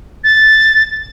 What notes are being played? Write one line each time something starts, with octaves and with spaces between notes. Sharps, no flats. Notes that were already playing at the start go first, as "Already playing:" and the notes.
A6